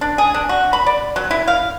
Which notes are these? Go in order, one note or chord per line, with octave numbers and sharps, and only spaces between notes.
D4
G#4
D4
F#4
B5
D5
F#3
E4
F5